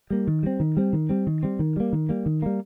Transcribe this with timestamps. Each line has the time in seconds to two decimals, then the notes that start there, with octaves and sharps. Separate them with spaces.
0.10 G3 A#3
0.27 D#3
0.43 G3 C4
0.60 D#3
0.77 G3 C4
0.93 D#3
1.09 G3 C4
1.27 D#3
1.43 G3 C4
1.59 D#3
1.76 G3 A#3
1.93 D#3
2.09 G3 A#3
2.26 D#3
2.42 G3 A#3